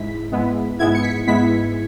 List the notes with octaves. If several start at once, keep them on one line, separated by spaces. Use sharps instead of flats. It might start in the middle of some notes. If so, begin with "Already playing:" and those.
Already playing: G#2 G#3 E4 B6
G#2 G#3 B3 E4
G#2 G#3 B3 E4 G#6
C#7
B6
G#2 G#3 B3 E4 B6